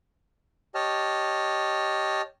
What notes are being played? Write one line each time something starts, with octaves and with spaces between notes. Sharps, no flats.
G4 C#5 D#5 A5 F6